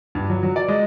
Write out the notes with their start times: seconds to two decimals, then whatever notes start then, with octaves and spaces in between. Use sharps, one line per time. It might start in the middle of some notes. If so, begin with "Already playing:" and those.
0.15 G2
0.30 F#3
0.43 F#3
0.56 D5
0.68 G#3